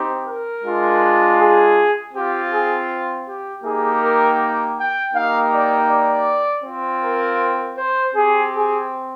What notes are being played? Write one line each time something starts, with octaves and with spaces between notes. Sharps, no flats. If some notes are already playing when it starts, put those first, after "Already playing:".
Already playing: C4 D#4 G4
A#4
G#3 D4 F4
G#4
C4 F4 G4
G#4
G4
A#3 D#4 G4 G#4
A#4
G5
G5
A#3 D#4 G4 F5
D5
D5
C4 F4
A#4
C5
C4 G4 G#4
G#4